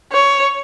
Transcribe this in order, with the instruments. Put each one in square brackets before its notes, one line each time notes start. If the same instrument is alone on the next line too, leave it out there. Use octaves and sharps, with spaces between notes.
[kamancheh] C#5